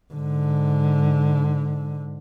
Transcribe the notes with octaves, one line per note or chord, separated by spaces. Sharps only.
G#2 D3